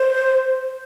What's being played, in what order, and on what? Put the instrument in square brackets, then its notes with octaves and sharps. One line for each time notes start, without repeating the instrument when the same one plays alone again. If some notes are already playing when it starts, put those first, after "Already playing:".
Already playing: [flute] C5